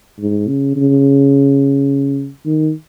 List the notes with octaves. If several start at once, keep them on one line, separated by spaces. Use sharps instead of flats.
G#2
C#3
C#3
D#3